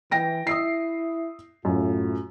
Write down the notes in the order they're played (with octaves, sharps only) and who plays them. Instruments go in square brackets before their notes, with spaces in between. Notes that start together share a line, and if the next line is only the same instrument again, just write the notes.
[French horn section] E3 [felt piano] G5 A#6 D7
[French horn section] E4 [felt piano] D#6 E6 C7
[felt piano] F#2 [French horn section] A2 F4